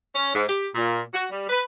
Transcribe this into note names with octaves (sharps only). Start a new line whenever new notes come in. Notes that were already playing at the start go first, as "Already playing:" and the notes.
C#4
G#2
G4
A#2
F#4
G3
B4